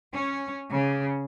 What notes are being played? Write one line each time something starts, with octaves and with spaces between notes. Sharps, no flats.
C#4
C#3